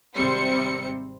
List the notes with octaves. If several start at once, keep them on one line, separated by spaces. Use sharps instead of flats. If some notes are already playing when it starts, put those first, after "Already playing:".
G#1 C3 G3 C4 C5 C#7